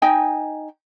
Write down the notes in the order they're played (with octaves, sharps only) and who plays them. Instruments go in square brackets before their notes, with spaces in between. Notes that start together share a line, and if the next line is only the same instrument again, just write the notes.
[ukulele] D#4 D#5 G5 G#5